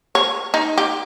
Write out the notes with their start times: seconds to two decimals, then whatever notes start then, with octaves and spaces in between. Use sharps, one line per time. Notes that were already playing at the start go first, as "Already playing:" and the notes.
0.15 C#5
0.54 D#4
0.78 G4